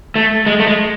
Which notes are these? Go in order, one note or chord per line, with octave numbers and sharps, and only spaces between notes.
A3
G#3
A3
G#3